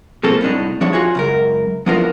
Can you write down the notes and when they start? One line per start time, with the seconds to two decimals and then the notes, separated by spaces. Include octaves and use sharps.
0.23 B2 F3 A#3 C4 A4
0.41 C2 A2 D4 D#4
0.81 F3 D4 C#5 E5
0.93 F4 F#4 G#4 C#5
1.15 C#2 F#2 A#4
1.86 F3 B3 D4 E4 F4 A#4